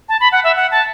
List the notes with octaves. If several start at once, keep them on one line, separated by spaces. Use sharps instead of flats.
A5
B5
F#5
E5
F#5
A5